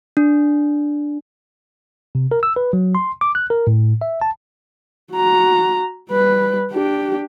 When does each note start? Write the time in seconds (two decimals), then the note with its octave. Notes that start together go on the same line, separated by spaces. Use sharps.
0.17 D4
2.15 C3
2.32 A#4
2.43 E6
2.56 B4
2.73 F#3
2.95 C6
3.21 D6
3.35 F#6
3.50 A#4
3.67 A2
4.01 E5
4.22 A5
5.12 F#4 A#5
6.10 G3 B4
6.71 D4 G4